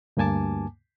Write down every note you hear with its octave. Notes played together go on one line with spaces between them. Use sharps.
D2 G2 A#3 G#5 A5 D6